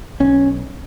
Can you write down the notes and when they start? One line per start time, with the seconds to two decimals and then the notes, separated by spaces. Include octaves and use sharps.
0.20 B1 C#4